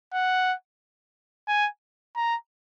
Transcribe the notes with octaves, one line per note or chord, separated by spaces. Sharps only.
F#5
G#5
A#5